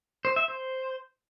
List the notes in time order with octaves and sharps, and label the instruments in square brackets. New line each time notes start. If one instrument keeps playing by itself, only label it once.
[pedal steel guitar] C5
E5
C5